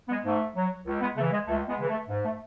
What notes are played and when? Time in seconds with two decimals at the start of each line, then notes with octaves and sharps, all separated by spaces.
0.09 G#3 B3
0.24 G#2 A3
0.55 F#3
0.86 C#2
1.01 G#3 B3
1.17 C#3 A3
1.20 E3
1.32 G#3
1.48 C#2 A3
1.68 G#3 B3
1.79 C#3 E3
1.89 A3
2.09 G#2
2.25 A3